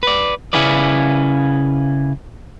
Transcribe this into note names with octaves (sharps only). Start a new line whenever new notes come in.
B4 D5
C#3 C#4 E4 G#4 B4 D5